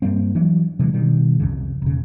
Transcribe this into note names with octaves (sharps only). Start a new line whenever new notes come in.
G2 G3 A#3 C4
E3 F#3 D4
C3 E3 F3 G#3
B2 D#3 G3
C2 F2 C#3
E1 C#3